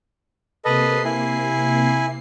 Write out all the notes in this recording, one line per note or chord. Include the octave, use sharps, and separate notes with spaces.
C3 A#3 A4 B4 D#5 C7
E4 G#5